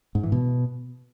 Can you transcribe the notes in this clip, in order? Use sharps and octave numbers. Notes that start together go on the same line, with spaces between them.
G#2
E3
B2